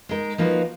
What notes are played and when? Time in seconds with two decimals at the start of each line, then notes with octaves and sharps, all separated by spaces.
0.09 G#3 D#4 A#4
0.38 F3 A#3 D#4 F#4 B4